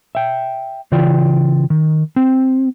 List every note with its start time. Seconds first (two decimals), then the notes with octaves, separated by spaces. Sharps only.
0.15 E5 G5
0.92 C#3 E3 F4 D5 G5
1.70 D#3
2.16 C4